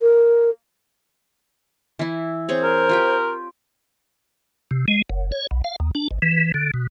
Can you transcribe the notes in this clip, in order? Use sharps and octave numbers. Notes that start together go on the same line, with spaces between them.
A#4
E3 E4
C4 G#4 C5 C#5
A#4
F4 G4 G5
C3
G#3
F#1
C#5
B1
F5
D#2
D4
G#1
E3
D3
B2